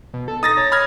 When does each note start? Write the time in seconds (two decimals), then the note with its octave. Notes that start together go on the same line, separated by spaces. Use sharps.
0.14 B2
0.28 A4
0.43 D#4 D#6 A6 A#6
0.57 C#5
0.72 B5 F6 G#6